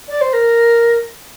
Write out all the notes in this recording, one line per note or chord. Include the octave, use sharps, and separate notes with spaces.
D5
C5
A#4